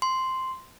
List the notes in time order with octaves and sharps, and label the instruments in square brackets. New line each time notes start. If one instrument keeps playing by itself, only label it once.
[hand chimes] C6